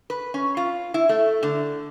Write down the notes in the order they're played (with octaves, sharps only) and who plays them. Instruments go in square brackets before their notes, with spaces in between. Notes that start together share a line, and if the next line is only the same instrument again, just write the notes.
[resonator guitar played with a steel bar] B4
C#4
F4
E4
A3
D3